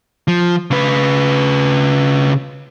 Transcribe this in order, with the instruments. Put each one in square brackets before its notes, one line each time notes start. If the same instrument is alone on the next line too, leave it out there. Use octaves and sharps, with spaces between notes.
[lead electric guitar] F3
C#3 B4